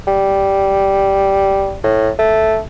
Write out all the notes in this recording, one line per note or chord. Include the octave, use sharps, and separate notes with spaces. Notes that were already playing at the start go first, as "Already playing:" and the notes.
G3
A2
A3